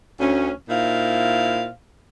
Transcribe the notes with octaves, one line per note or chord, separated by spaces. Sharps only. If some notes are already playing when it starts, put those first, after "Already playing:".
D2 C#4
A#2 D#4 E4 C5 F5